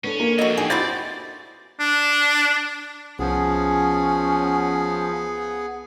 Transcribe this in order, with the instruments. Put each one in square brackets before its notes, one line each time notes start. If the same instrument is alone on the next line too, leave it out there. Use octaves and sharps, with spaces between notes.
[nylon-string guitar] B3 D4 A4 [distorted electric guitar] C#4
[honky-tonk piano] A#3
[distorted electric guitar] F2 E3 [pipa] F#4 D#5
[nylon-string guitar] D4 D#4 G4 [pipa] G#4
[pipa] E4 F#4 C5 [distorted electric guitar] D5 [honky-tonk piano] A6
[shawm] D4
[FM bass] C2 [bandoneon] F3 [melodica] B3 G#4 [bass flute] C#4